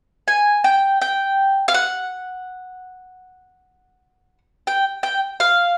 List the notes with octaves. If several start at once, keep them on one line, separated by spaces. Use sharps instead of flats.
G#5
G5
G5
F5
F#5
G5
G5
F5